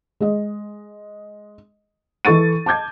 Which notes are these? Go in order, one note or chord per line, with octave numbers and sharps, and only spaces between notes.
G#3 D#5
E3 A4 C#6 A6 D#7
A5 D6 G6 G#6